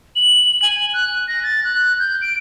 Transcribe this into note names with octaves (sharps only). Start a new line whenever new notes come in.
F#7
G#5
F#6
A#6
A6
F#6
G6
D7